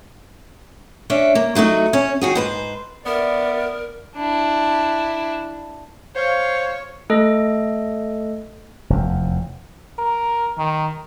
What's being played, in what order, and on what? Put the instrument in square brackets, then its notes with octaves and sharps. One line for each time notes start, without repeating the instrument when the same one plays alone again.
[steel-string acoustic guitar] C#4 D4 E5
A#3
F#3 A3 D#4 F#4
C#4 C#5
D#3 F#4 G#4
G#2 B4 C5
[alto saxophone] B3 [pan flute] A#4 [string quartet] D5 [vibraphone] E5 B5
[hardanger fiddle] D4 E4
[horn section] C5 F5 [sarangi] C#5
[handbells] A3 A4 D#5
[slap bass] F1 E2
[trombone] A#4
D#3